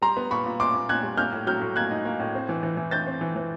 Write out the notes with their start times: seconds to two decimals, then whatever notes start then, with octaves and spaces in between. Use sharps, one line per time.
0.02 G3 A#5 C6
0.17 B3
0.31 A#2 B5 C#6
0.46 A#2
0.60 A#2 C6 D6
0.75 A#2
0.89 A#2 F#6 G#6
1.03 G3
1.17 A#3 F6 G6
1.32 A2
1.47 F#3 F6 G6
1.61 A2
1.76 A#3 F#6 G#6
1.91 D#4
2.05 A#3
2.20 A2
2.35 C4
2.49 E3
2.63 E3
2.77 E3
2.91 C4 G6 A6
3.07 C4
3.21 E3
3.36 E3